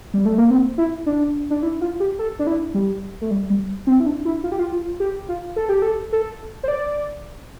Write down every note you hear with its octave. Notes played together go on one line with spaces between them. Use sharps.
G3
A3
A#3
C4
E4
D4
D4
E4
F4
G4
A4
D4
E4
G3
A3
G3
G3
C4
E4
D4
E4
F4
G4
F4
F4
G4
F4
A4
G4
A4
A4
C5
D5